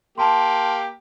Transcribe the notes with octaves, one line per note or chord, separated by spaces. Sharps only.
A#3 G4 A5 C6